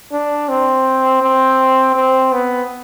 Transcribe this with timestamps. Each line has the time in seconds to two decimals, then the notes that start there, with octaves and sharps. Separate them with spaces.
0.12 D4
0.49 C4
1.23 C4
1.96 C4
2.32 B3